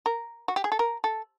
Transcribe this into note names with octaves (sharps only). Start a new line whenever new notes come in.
A#4
F#4
G4
G#4
A4
A#4
A4